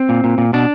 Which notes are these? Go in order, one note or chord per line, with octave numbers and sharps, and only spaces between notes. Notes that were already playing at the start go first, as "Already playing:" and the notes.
Already playing: C4
A#2
A#2
A#2
B2 D4